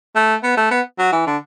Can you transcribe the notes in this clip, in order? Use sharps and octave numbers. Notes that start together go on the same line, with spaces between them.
A3
B3
A3
B3
F#3
E3
D3